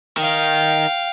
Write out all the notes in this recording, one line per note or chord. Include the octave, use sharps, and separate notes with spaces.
D#3 F5 G5